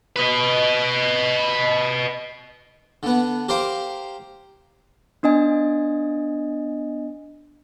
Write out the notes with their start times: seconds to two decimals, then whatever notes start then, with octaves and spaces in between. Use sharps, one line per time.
0.16 B4 D#5
3.03 D3 B3
3.49 G4 A#4 C5 F5 G5
5.23 B3 D4 D#5 G#5